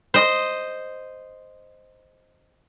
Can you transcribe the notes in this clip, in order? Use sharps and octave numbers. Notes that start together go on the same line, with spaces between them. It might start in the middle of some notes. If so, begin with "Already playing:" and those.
C5 D#5